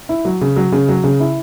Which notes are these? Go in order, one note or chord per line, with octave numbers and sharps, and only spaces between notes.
E4
F#3
C#3
F#3
C#3
F#3
C#3
E4